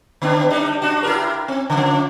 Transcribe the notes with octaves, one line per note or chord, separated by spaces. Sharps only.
D3 B3 D4
G3 D4 D#4
D4 F#4
E4 G4 A#4
C4
C#3 F3